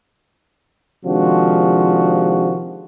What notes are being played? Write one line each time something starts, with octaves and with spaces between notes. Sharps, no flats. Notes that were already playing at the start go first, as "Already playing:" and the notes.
C3 D#3 F3 G#3 D4 F#4